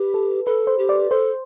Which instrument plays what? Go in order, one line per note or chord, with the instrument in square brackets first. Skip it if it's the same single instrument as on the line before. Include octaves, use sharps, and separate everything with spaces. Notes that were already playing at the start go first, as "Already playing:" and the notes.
Already playing: [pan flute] G4 [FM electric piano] B4
[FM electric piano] A4
[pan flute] A4 [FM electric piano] B4
[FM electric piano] C5
[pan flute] G4
[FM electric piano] D5
[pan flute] A4 [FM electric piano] C5